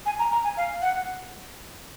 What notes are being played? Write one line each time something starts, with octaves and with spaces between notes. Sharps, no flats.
G#5
A#5
A#5
G#5
F5
F#5